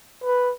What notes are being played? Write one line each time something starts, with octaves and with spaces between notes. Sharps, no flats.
B4